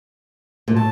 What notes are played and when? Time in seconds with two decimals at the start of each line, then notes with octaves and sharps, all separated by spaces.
0.68 A#2
0.76 A2 A5